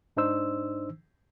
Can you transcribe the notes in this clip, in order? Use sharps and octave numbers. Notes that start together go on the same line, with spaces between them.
G#2 D4 D#4 C5 E6